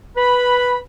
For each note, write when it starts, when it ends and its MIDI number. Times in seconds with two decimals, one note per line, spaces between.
0.17 0.77 71
0.17 0.77 83